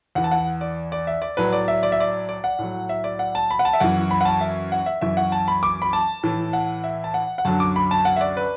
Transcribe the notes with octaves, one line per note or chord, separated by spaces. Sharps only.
E2 E3 F#5
A5
F#5
D5
D5
E5
D5
A2 F#3 B4
D5
E5
D5
E5
D5
D5
F#5
A2 F#3
E5
D5
F#5
A5
B5
F#5
A5
E5
F#2 E3 F#5
B5
F#5
A5
E5
F#5
E5
F#2 E3 E5
F#5
A5
B5
D6
B5
A5
A2 E3
F#5
E5
A5
F#5
F#5
F#2 D3 F#3 A5
D6
B5
A5
F#5
E5
D5
B4